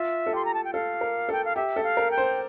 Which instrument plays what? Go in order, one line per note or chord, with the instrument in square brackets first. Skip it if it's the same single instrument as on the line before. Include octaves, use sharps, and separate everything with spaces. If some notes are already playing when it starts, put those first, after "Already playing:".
Already playing: [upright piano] F4 [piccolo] E5
[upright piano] A4
[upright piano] G4 [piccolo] C6
[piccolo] A#5
A5
G5
[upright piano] A4 [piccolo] F5
[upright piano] A#4
[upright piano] A4 [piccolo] G5
[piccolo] F5
[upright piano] G4 [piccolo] E5
[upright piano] A4
[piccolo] F5
[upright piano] A#4
[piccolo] G5
[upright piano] C5